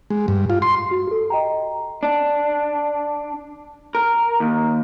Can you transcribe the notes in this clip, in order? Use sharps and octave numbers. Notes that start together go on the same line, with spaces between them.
G#3
G2
F4
C6
F#4
G4 A4
D#5 G5 A#5
D4
A#4
D#2